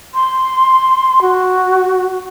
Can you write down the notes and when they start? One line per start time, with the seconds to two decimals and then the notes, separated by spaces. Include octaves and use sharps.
0.15 C6
1.22 F#4